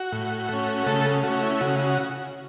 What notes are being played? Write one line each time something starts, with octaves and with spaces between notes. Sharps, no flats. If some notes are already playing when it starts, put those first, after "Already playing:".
Already playing: F#4
A2
A3 C#4
C#3 A3 A4
A3 C#4 F#4
E4
C#3 F#4
F#4